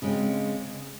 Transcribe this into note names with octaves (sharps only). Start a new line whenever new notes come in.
C#3 G#3 C4